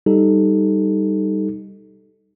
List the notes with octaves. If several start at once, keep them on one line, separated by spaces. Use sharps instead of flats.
G3 D#4 G4 A4